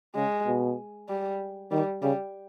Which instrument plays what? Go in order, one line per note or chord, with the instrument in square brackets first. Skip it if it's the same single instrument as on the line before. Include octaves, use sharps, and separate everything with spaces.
[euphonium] C#3 [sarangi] G#3
[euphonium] B2
[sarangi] G3
[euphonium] D#3 [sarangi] G3
[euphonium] C#3 [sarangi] G3